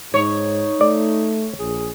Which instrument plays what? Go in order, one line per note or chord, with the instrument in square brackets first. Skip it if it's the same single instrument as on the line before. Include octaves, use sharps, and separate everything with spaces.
[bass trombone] G#2 [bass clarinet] D#4 [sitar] C#5
[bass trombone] A3 [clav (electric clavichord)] D5
[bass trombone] A#1 [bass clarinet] G#4